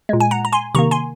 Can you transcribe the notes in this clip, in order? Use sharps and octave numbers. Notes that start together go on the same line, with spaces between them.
A#2 G#3
G#5
F#5 A#5
A#5
G#5 C6
C3 D#3 A#3 A#5 C#6
G#5 C6